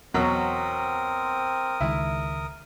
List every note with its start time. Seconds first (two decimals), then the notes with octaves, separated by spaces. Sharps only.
0.14 E2 B2 F#3 C4 A#4 D#6
1.80 C#2 D#3 G#3 E4